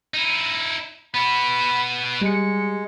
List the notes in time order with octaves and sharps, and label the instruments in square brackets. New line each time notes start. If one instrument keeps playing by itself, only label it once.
[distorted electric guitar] D#4 E4
[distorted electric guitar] B3 F#4 [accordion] B5
[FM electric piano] G3 C#7 [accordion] G#3